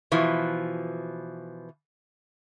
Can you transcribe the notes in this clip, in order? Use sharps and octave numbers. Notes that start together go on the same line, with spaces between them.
B2 E3 F3